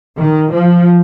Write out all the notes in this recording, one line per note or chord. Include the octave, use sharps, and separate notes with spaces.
D#3
F3